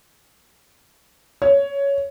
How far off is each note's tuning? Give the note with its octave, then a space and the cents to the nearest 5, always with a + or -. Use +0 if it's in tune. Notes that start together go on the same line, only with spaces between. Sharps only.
C#5 +10